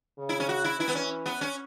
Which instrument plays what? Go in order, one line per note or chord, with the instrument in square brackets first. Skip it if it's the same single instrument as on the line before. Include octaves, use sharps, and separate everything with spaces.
[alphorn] C#3
[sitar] E4
C#4
F#4
E4
[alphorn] E3 [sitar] E4
[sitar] B3
C#4
B3
C#4